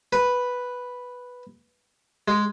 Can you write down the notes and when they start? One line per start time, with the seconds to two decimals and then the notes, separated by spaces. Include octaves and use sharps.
0.13 B4
2.28 G#3